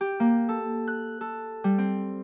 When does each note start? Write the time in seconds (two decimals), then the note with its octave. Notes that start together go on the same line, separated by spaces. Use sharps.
0.01 G4
0.20 A#3
0.49 A4
0.88 F#6
1.21 A4
1.64 G3
1.78 C4